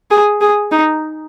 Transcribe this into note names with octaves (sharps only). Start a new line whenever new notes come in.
G#4
G#4
D#4